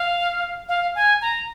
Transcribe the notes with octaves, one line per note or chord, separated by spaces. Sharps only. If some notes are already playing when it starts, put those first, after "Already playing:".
Already playing: F5
F5
G#5
A#5